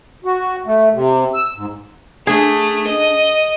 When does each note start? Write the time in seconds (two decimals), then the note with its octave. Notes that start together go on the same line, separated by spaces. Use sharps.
0.25 F#4
0.66 A3
0.94 C3
1.34 E6
1.56 G#2
2.27 A3 D4 G#4
2.87 D#5